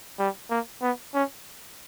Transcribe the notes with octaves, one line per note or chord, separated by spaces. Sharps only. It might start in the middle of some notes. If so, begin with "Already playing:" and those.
G3
A#3
B3
C#4